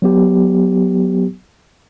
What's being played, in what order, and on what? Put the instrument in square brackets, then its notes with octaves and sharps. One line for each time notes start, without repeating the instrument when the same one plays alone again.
[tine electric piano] F#3 B3 G4